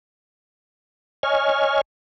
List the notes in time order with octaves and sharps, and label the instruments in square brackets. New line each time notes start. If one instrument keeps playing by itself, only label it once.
[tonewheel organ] C#5 D#5 G#5 F6